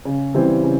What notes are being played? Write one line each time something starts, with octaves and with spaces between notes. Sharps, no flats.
C#3
E3 G3 C4
C#3